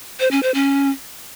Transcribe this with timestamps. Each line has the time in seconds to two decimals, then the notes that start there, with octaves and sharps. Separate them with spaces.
0.19 C5
0.31 C#4
0.43 C5
0.54 C#4